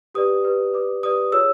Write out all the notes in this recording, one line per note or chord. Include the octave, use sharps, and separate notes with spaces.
G4 B4 D5 D#6
G4 B4 D5
G4 B4 D5 D6
G4 B4 D5 D#6
F4 G#4 C#5 E6